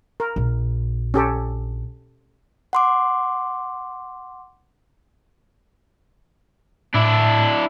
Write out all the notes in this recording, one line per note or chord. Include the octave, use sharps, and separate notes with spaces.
A#4
A#1
C#4 G4 A4
F#5 C6 D6
A2 D4 E4 E6